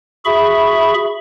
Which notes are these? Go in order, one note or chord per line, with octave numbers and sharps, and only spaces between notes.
F#4 G#4 E5 B5 C#6